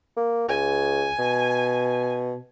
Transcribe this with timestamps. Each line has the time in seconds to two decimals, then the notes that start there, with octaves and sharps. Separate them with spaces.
0.17 A#3
0.49 C#2 G#5
1.19 B2